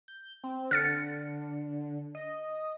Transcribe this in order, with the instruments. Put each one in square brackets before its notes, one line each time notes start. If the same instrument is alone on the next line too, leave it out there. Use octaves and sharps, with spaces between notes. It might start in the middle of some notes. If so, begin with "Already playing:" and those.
[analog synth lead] G6
C4
[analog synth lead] D3 [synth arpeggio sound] F6 A6 C#7
[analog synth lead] D#5